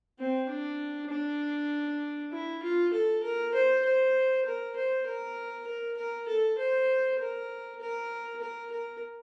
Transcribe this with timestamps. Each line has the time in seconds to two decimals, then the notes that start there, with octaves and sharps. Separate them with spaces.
0.20 C4
0.50 D4
1.11 D4
2.33 E4
2.63 F4
2.93 A4
3.23 A#4
3.54 C5
3.85 C5
4.46 A#4
4.76 C5
5.07 A#4
5.67 A#4
5.97 A#4
6.28 A4
6.59 C5
7.19 A#4
7.80 A#4
8.42 A#4
8.71 A#4